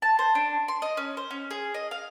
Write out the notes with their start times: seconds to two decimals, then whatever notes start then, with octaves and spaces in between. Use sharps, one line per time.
0.02 A5
0.19 C5
0.35 D4
0.68 C6
0.82 D#5
0.97 C#4
1.17 C5
1.31 C#4
1.51 G#4
1.74 D#5
1.91 F5